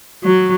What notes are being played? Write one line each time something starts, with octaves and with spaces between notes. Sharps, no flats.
F#3